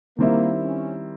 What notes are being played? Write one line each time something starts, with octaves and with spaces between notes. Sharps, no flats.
D#3 G3 A#3 C4 E4
C#4